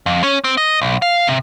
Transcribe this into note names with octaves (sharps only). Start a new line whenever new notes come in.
F2
C#4
C4
D#5
B1
F5
C3